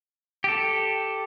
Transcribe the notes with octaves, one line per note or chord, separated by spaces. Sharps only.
G4 A4